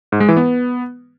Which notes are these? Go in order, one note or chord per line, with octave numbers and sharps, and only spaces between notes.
G#2
G#3
E3
B3